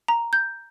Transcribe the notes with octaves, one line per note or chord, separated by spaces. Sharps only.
A#5
G6